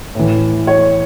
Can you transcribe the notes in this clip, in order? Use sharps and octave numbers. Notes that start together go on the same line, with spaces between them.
A2 E3
C#5